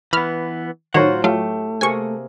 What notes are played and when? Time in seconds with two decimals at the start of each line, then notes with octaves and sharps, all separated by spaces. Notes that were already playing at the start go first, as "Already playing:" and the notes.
0.13 E3 B3 B5 F6
0.94 A2 D#3 F#3 F4 F#4 C5 C#5 F#5
1.24 F#3 A3 F4 G4 F5
1.81 C3 A#3 G#4 G#5 C#6